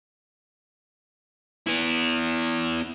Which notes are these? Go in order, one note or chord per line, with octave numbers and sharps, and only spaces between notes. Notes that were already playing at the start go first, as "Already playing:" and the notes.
B3 E4